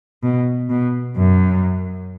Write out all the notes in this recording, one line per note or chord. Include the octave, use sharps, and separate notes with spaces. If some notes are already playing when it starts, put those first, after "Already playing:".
B2
B2
F#2